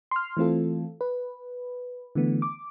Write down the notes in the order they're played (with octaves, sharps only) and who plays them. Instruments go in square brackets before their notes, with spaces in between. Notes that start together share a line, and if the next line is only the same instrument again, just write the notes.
[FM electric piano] C6 F6
E3 A3 C4 F4 A4
B4
D3 E3 A3 B3
D6